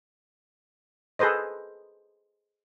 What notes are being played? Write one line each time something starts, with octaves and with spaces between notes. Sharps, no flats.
G#4 A4 B4 C5 D#5